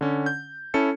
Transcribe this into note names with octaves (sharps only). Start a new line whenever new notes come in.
D3 C#4
G6
C#4 E4 A4 A5 C#7